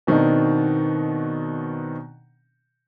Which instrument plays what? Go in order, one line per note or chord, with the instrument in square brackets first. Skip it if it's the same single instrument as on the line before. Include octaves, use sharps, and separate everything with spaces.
[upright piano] B2 D#3 C4 D4 D#4